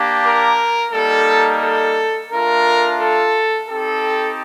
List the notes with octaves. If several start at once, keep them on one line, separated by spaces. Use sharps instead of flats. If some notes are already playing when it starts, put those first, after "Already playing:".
Already playing: A#3 D4 G4
A#4
G3 A#3 D#4 A4
A4
A3 D4 F4 A#4
A4
C4 D#4 G4 A4